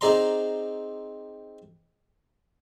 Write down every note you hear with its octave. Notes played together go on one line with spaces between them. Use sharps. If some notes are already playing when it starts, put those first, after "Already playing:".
C4 D#4 G#4 D5 A#5 C6